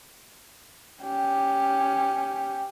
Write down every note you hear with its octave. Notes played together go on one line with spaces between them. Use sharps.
C#4 G4